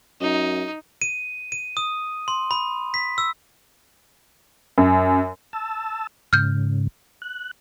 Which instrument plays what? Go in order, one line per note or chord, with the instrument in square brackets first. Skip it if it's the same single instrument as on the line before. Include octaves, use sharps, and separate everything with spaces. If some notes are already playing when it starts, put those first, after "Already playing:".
[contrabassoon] F#2 [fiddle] D#4
[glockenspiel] D#7
D#7
D#6
C6
B5
B6
E6
[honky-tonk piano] F#2
[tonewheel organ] A5 E6
[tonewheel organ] G#2 C#3 [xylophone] F6 G6
[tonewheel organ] F#6